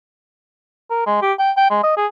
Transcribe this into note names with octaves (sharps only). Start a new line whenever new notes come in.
A#4
G#3
G4
G5
G5
G#3
D#5
G#4